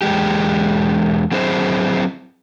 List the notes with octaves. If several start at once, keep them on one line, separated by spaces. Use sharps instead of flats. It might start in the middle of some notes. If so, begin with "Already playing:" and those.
E2 G#3 G4
F#3 C4 E4 G#4 C5